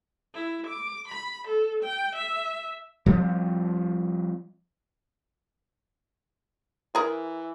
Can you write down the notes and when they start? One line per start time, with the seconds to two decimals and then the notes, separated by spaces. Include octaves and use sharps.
0.34 E4
0.67 D6
1.08 B5
1.48 A4
1.83 G5
2.15 E5
3.06 F3 G3 C4
6.95 E3 G#4 A#4